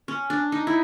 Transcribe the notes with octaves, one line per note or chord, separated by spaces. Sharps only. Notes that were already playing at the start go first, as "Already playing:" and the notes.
C#4
D4
D#4
E4